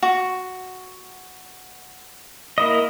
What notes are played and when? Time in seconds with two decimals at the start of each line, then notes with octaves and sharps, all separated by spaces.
0.03 F#4
2.58 A#3 E4 D#5